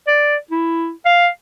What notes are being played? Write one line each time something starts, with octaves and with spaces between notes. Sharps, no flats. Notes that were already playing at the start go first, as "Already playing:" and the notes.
D5
E4
F5